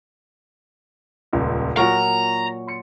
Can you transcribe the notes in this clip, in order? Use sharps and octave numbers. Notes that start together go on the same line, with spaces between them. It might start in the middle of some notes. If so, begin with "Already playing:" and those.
D#1 C#2
A#2 F#3 A#4 A#5 C#6
C6 C#7